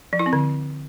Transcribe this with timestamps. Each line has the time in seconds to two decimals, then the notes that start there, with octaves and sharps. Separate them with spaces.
0.13 F3
0.19 E4
0.26 C4
0.33 D3